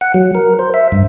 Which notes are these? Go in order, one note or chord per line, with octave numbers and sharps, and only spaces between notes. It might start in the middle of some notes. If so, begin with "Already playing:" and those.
F#5
F#3
A#4
C5
E5
G2